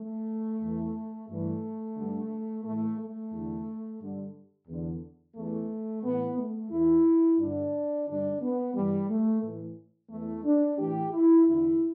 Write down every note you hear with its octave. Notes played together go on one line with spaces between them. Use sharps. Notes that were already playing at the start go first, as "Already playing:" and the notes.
Already playing: A3
E2 E3
G2 E3 A3
G2 D3
A2 E3 A3
A3
E2 D3
G2 D3
E2 D3
E2 E3 A3
A2 E3 B3
A3
E2 E3 E4
G2 D3 D4
G2 D3 D4
B3
G2 E3 G3
A3
A2 E3
E2 E3 A3
D4
A2 E3 G4
E4
E2 D3 E4